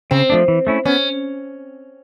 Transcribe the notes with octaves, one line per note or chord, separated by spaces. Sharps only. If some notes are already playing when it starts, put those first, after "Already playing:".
C#3 C4
F3 A3 D4
E3
A3 C#4 E4
B3 C#4